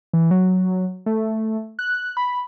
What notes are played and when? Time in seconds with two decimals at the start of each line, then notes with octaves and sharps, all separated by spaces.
0.13 E3
0.31 F#3
1.06 A3
1.79 F#6
2.17 B5